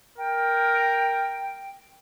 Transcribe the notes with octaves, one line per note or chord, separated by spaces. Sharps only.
A#4 G5